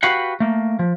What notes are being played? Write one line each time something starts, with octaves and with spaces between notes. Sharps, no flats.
F#4 G4 B4 F5 F#5
A3 A#3
F3